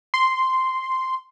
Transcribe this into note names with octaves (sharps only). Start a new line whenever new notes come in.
C6